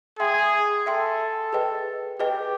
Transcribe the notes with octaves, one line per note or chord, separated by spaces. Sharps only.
G#4 E5 G5 C6
A4 E5 G5 C6
G#4 B4 D#5 G5
G4 G#4 B4 D#5 G5